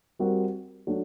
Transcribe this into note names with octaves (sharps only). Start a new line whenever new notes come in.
G3 C4 F#4 A#4
F#3 A3 D4 F#4